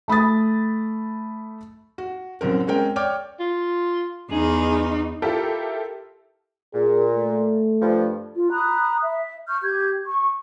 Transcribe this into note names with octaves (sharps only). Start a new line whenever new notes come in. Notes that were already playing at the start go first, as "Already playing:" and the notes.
A3 B5 D#6 A6
F#4
C2 F#2 C4 A#4
G#3 C4 C#4 A#4 G5
C#5 D5 G5 D6 F6
F4
E2 D#4 G#4
E4 F4 G4 A4 A#4 E5
A#2 G#4
A3
G2 F3
F4
A#5 B5 D#6 F#6
E5
C#6 F6 G6
G4 G6 G#6
C#6